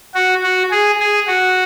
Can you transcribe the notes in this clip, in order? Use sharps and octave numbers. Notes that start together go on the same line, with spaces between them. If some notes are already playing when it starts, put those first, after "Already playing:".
F#4
F#4
G#4
G#4
F#4